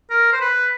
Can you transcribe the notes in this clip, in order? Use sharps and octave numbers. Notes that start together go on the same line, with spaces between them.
A#4
C5
B4